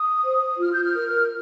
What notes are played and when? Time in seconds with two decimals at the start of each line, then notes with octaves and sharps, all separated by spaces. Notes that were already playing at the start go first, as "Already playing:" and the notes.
Already playing: D#6
0.24 C5
0.59 F4 F6
0.72 G6
0.84 F6
0.95 A#4